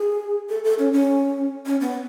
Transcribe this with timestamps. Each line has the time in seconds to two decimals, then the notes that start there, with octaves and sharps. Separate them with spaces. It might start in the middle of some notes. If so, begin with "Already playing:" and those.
Already playing: G#4
0.49 A4
0.64 A4
0.79 C#4
0.93 C#4
1.66 C#4
1.81 B3